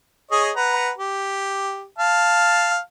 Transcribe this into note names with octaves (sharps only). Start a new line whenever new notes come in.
G#4 C#5 D#5
B4 F#5 A#5
G4
F5 A5